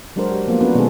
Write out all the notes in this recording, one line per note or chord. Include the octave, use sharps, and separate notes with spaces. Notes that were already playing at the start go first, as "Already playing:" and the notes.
F#3 G#3 D4 F#4 A#4 C5
G4
F3 A#3 B3 F4
B3 C#4 D4 F#4 A#4 B4
B2 D#3 G#3 C#4 G#4 A4